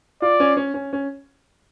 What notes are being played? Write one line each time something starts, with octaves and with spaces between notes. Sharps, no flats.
F4 D5
C#4
C#4
C#4
C#4